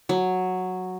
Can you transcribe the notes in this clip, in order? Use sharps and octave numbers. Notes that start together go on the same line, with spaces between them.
F#3